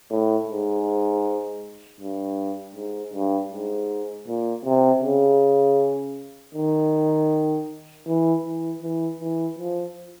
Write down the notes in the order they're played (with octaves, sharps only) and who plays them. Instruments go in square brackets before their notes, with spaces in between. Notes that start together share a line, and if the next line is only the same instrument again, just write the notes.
[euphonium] A2
G#2
G2
G#2
G2
G#2
A#2
C3
C#3
D#3
E3
E3
E3
E3
F3